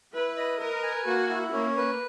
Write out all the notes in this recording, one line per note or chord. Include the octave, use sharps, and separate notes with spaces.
E4 B4
D#5
A#4 B4
G#5
A#3 F#4
E4
A#3 C#4
B4